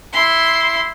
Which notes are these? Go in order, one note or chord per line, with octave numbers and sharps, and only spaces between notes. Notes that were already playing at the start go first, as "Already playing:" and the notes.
E4 C6